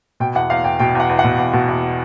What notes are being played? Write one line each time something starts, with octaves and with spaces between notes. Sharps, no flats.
B2 G5
E2 F#5
E2 F5
E2 G5
B2 G5
E2 F#5
E2
F#5
B2
E2
B2
E2